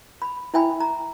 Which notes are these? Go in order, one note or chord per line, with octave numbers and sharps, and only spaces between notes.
B5
E4 E5 G5 G#5 B5
A#5